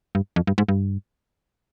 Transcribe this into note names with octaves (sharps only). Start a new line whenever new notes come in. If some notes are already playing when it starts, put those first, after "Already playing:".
G2
F2
G2
G#2
G2